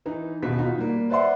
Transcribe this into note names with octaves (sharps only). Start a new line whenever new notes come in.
E3 D#4
D#1 B2 B6
D#4 F4 F#4
G3 A#3
B4 C5 D5 E5 F#5 C6